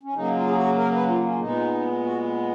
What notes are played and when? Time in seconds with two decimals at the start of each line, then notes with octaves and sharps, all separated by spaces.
0.03 C#4
0.13 C#3 F#3 A#3 D#4
0.35 F4
0.47 G#4
0.56 F#4
0.77 A#4
0.93 B4
1.08 F4
1.24 C#4
1.31 F4
1.39 A#2 G#3 B3 D#4
2.03 F#4